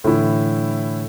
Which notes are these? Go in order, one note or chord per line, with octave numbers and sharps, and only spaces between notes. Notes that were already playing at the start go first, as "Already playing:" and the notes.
A2 D3 E3 E4